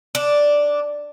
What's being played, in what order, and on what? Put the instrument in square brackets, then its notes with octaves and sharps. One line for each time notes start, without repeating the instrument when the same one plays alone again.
[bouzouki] D4